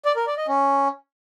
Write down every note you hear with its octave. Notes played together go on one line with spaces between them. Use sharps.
D5
A#4
D5
D#5
C#4